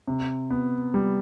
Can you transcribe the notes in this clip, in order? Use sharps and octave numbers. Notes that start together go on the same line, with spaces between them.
C3
B3
G3